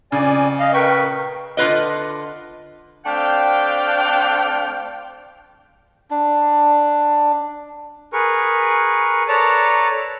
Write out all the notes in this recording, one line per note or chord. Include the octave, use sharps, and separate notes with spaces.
F2 C#3 D5 G#5
D#5 F5
A#4 B4 G5 C#6
A#2
D3 F4 B4 D#5
A3 C4 D4 F5 G5
D4
G#4 A#4 B4 C#6
A4 B4 C#5 D5 A5 A#5